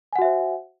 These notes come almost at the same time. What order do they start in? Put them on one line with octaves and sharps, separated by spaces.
G#5 F#5 F#4 E5 C5